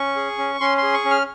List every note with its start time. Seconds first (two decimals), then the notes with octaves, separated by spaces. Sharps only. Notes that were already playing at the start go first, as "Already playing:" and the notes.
Already playing: C#4 C#6
0.16 G#4
0.38 C#4
0.60 C#4 C6
0.78 C6
0.83 G#4
0.94 C#6
1.05 C#4
1.11 F6